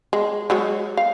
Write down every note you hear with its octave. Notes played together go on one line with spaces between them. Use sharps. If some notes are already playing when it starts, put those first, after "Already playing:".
G#3
F#3 G#3 C#5
F5